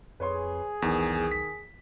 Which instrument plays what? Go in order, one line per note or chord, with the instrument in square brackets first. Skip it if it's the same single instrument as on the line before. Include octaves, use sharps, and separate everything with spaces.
[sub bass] F2 [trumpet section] G#4 [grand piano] B4 C#5 C6
[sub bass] B1 [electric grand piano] E2 [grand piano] D#3
[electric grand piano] B6